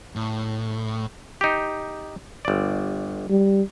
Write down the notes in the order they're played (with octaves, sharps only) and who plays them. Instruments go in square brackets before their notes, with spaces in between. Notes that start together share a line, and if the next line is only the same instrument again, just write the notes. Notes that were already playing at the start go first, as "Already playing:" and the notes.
[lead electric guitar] A2
[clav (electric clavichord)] D#4 G4
G1 D5
[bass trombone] G3